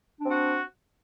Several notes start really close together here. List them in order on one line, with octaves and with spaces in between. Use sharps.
D4 C4 F#4